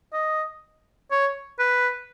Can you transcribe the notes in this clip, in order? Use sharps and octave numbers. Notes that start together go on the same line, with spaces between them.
D#5
C#5
B4